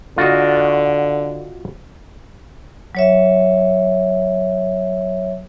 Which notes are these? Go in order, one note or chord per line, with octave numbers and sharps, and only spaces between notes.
D3 F4 F#4 D#5
F#3 C#5 E5